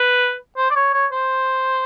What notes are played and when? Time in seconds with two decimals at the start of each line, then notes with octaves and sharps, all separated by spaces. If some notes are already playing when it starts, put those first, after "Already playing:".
Already playing: B4
0.57 C5
0.70 D5
0.76 C#5
0.93 C#5
1.12 C5